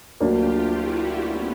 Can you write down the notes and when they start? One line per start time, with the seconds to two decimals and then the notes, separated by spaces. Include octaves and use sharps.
0.20 D2 D3 F#3 A#3 D4 F4 G4
0.71 E4 F#4
1.20 B3 C#4